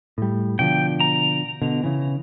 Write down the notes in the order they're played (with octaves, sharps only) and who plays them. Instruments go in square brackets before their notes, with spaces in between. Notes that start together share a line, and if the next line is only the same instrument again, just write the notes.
[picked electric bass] A2 G3
[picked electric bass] B2 D3 F3 [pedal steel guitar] G5
[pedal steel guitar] A#5
[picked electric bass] B2 D3
C#3 E3